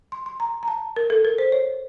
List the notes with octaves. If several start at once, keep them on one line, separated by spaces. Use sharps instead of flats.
C6
C6
A#5
A#5
A5
A#4
A4
A#4
C5
C#5